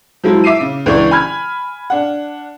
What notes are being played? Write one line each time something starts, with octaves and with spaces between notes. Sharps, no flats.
F3 F#3 G#3 E4
E5 D6 C7 D#7
C#3
C#2 E3 D4 D5 C#6
G#5 B5 F6 G#6
D4 F#5